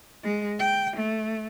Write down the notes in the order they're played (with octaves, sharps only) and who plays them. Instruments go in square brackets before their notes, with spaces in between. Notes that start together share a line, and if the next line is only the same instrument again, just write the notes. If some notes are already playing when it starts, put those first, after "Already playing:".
[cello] G#3
G5
A3